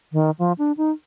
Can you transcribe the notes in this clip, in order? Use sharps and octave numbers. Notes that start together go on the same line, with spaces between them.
D#3
F3
D4
D#4